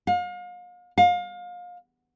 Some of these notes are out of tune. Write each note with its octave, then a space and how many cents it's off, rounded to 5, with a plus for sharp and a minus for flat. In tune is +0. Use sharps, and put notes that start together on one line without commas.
F5 +40
F5 +30